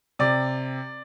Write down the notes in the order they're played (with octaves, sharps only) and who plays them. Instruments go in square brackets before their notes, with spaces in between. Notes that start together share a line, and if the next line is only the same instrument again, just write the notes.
[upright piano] C3 D5